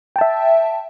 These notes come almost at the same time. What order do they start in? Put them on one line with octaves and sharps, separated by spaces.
G5 A5 E5